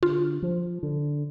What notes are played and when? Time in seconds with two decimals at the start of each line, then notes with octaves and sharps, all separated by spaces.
0.03 D3 F4
0.42 F3
0.83 D3